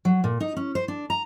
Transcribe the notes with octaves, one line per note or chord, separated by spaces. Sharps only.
F#3
A#2
D#4
C#4
C5
D4
A#5